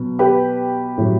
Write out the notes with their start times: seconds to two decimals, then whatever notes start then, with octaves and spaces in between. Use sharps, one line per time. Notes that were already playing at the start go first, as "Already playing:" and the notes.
Already playing: B2 F#3
0.19 G4 B4
0.98 A2 F#3